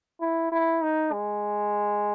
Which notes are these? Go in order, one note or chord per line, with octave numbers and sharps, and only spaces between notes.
E4
E4
D#4
G#3